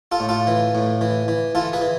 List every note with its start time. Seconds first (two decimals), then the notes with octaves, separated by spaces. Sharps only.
0.12 F4 A4
0.20 A2
0.29 F4 A4
0.47 E3
0.75 A2
1.01 E3
1.28 E3
1.55 E3 F4 A4
1.73 G#4 B4
1.81 E3